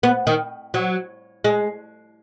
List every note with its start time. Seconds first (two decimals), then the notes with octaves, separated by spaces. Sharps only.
0.03 B3
0.27 D#3
0.74 F#3
1.44 G#3